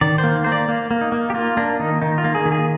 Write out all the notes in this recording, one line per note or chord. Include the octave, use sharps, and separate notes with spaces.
D#3 D5
C5
A#3
A#3 C5
D5
A#3
A#3
D#4
A#3
G4
A#3 F4
A#3 D4
D#3 D#4
D#3 D#4
F4
A#3
G#4
D#3
G#4